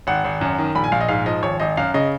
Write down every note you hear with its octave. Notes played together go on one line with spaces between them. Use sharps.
G#1 F#5
G#1
F#2
D#3
A#1 B5
G#5
A#1 F5
D#5
G#2 F5
F3 D#5
G#1 C#5
G#1 D#5
F#2 F5
C#3 D#5